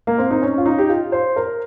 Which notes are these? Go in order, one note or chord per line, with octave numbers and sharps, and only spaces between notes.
A#3
C4
D#4
C#4
F4
D#4
G4
F4
C5
A#4